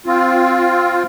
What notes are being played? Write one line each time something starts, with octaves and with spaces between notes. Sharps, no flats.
C4 F4